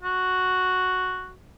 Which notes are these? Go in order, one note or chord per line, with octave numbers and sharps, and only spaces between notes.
F#4